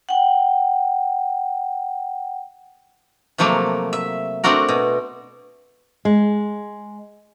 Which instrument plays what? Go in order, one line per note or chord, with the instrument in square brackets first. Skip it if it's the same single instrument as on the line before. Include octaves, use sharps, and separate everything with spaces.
[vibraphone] F#5 G5
[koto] C3 F3 F#3 A3 A#3
E5
A3 C4 D4 F#4 A#4
B2
[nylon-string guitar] G#3